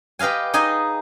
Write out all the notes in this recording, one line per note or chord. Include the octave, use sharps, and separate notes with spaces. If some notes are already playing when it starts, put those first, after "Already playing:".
G4 B4 D#5 F5 G#5
D#4 G#4 D#5 G#5